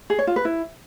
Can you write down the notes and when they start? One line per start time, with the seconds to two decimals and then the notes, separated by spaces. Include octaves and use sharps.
0.10 G#4
0.19 C#5
0.27 F4
0.36 B4
0.45 E4